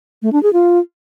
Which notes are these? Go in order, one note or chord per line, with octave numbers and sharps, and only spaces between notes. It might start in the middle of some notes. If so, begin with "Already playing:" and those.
A3
D4
G#4
F4